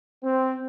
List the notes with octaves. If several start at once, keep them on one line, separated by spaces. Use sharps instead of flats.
C4